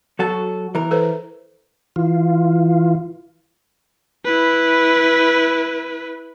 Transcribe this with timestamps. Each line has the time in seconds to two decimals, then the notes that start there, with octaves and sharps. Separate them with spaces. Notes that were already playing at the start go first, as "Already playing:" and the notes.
0.19 F#3 F#4 A4
0.75 E3 A#4
0.91 A4 B4 C5
1.96 E3 F4
4.25 E4 B4